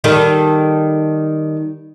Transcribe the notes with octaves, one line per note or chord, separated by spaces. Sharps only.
D#3 G3 A4